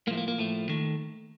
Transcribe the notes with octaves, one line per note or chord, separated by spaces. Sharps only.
A2 F3 A3 A#3
A#3
A#3
A2 F3 A3
D#2 D#3 A3